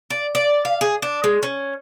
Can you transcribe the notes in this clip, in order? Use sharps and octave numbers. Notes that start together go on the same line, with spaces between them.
D5
D5
F5
G#4
D4
G#3
C#4